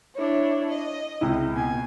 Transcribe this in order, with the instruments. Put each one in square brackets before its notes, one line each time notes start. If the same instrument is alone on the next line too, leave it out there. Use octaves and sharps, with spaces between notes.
[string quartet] D4 E4 C#5
D#5
[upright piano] C#2 C3 E4
[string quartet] B2 G#5